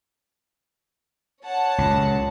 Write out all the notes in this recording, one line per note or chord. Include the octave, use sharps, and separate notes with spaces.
C#5 F#5 A5
C#2 A#2